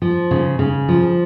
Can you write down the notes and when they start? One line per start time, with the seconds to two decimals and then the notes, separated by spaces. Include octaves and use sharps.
0.02 F3
0.31 C#3
0.59 C#3
0.89 F3